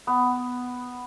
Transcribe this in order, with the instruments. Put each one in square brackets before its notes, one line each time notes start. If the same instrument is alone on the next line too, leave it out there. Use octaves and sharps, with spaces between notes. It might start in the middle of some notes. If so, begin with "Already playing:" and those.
[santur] B3